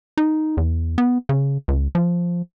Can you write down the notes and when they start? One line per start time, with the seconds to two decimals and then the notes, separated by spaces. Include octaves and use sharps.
0.18 D#4
0.57 E2
0.98 B3
1.29 C#3
1.68 C#2
1.95 F3